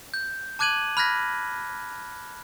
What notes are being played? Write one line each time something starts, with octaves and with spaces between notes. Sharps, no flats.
G6
A5 D6 F#6 G#6 D#7 F#7
B5 F6 F#6 G#6 A#6 B6